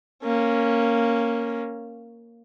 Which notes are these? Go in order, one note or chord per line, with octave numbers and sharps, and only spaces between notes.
A#3 C#4